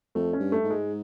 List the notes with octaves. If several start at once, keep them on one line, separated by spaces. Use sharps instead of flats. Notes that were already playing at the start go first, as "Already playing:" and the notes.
F2 A3
C#4
G2
A3
G#2
G#3